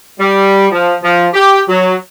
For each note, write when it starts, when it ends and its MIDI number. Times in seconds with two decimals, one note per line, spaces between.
0.20 0.67 55
0.72 0.95 53
1.03 1.27 53
1.33 1.61 67
1.69 1.94 54